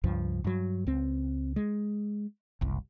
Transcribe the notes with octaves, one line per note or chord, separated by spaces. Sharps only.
C#2 G2 F3
G2 F#3
C#2 C4
G#3
F#1 C2